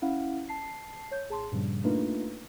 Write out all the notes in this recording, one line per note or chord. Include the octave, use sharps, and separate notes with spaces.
C#4 E4 F5 F#5
A5 C7
C#5 G6
A1 G#4 A5 C6
G2 A#2 C#3 F3 G3
A3 A#3 D4 D#4 F4 B4